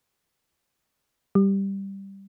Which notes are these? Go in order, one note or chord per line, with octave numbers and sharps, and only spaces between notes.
G3